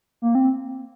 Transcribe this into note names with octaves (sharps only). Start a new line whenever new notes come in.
A#3
C4